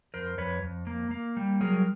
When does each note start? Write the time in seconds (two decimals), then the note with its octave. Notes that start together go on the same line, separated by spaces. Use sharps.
0.14 F2 A#4 C5
0.38 F2 B4 C#5
0.62 F2
0.87 A#3
1.11 A#3
1.37 G3
1.61 F#3 G#4 A#4